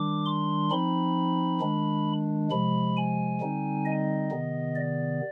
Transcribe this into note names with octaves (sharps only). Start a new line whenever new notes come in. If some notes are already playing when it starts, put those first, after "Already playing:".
Already playing: D#3 G3 D4 D6
C6
F3 C4 D#4 B5
D#3 G#3 D4
C3 F3 G#3 B5
G#5
D3 G3 C4 D#4
D#5
C3 D#3 B3
D5